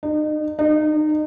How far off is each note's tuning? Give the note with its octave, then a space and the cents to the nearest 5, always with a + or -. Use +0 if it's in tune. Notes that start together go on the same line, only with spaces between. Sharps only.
D#4 -35
D#4 -30